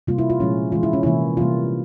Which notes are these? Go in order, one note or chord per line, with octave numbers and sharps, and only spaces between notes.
C3 G3 A#3 F4
E4
F4
A#2 F3 G#3 C#4
E3 G#3 F4
E4
C#4
C3 E3 A#3 E4
C3 E3 G3 A#3 F4